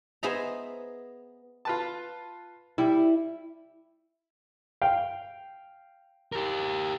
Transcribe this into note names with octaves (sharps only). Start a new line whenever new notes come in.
B3 G#4 C5 D#5 E5 A#5
F4 B4 A5
G3 E4
F5 G5
G4 A#4